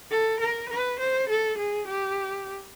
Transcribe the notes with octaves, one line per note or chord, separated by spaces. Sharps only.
A4
A#4
B4
C5
A4
G#4
G4